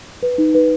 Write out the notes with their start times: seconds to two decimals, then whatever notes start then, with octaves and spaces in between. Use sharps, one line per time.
0.23 B4
0.38 D#4
0.55 B4